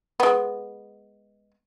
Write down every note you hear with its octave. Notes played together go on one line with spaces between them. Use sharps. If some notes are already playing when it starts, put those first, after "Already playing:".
G#3 B3